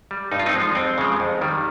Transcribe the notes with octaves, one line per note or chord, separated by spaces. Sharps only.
G3
G2 D#4
F4
C4 D#4
F3 G#3
F2 C4
C#3 F3 G#3
F2
D#3 G3